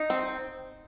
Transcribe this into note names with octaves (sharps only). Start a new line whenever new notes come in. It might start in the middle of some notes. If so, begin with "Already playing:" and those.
Already playing: D#4
C4